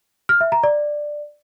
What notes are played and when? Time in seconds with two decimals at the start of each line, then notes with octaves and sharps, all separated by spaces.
0.29 F6
0.41 E5
0.52 A#5
0.64 D5